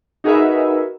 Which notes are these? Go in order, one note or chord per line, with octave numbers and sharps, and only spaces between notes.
D#4 F#4 G#4 A#4 B4 E5